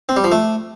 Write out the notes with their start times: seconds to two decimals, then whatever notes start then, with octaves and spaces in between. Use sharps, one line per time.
0.09 C4
0.17 G3
0.24 F3
0.32 A3